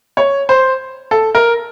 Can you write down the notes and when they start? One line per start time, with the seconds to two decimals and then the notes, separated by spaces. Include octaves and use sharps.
0.17 C#5
0.49 C5
1.11 A4
1.35 A#4